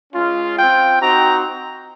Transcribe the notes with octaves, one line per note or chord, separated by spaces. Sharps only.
G#3 C#4 F4
C4 F4 G5
C4 D#4 F#4 A#5